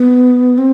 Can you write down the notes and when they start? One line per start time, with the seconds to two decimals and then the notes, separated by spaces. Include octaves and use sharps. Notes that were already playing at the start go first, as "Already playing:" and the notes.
Already playing: B3
0.58 C4